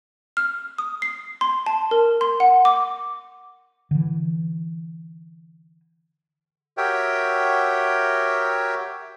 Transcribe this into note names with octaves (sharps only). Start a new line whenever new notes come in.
F6
D#6
C7
C6
A5
A#4
C6
F#5
D6
D3 E3
F#4 G4 A#4 C#5 E5 G5